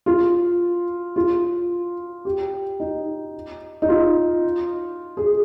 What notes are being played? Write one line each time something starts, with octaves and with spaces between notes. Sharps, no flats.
F4
F4
G4
D#4
D#4
F4
G#4